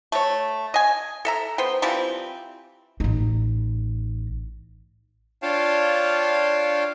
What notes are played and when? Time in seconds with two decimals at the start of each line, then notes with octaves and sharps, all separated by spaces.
0.12 A3 C#5
0.74 D#5 G#5
1.25 A4 E5 A#5
1.58 B3 C5 G5
1.82 E3 F3 G3 C4
3.00 A1 D#4
5.42 D4 F4 C#5 F5 G5 A5